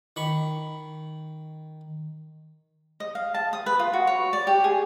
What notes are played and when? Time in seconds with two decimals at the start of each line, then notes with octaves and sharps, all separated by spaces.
0.16 D#3 B5 C#6
3.00 D#5
3.15 F5
3.34 A5
3.53 D#6
3.66 B4
3.79 F4
3.93 F#4
4.07 C#5
4.33 D5
4.47 G4
4.64 G#4